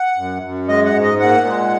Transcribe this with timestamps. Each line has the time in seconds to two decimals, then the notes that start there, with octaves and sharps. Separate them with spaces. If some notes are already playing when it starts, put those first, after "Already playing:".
Already playing: F#5
0.17 F#2
0.42 F#2
0.69 G#3 D#5
0.86 F#5
0.94 G#2
1.03 D#5
1.20 A#2 F#5
1.46 G#3